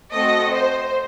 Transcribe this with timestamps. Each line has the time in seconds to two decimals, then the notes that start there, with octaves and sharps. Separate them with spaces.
0.12 A3 C4 F#4 A4 D#5
0.54 C5